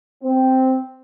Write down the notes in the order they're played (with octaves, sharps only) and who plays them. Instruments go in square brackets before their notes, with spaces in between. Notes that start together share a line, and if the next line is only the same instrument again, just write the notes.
[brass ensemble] C4